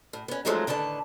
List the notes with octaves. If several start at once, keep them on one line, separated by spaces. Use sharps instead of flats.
A2
B3 C#4
F3 F#3 G#3 A3 C4 D#4
A2 D3 D#3 B4 A5